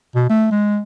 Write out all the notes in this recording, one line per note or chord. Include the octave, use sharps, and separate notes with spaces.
B2
A3
G#3